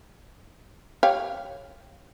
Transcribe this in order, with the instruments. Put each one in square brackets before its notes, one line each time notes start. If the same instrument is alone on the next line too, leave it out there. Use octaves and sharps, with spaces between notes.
[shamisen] G4 C#5 F5